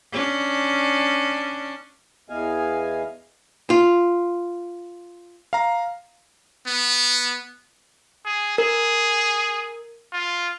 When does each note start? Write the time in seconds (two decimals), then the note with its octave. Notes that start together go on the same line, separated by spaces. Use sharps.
0.13 C#4 D4
2.30 E2 E3 B3 D#5 F5 G#5
3.70 F4
5.53 F5 A#5
6.67 B3
8.25 G#4
8.58 G#4 A#4
10.12 F4